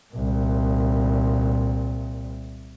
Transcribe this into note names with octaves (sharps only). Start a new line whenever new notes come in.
C2 A#2